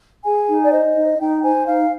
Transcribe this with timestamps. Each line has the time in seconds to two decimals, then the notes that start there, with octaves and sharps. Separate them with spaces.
0.24 G#4 G#5
0.47 D#4
0.62 D5
0.71 C5 D#5
0.95 D#4
1.19 D#4 G5
1.43 C5 G#5
1.66 D#4 F5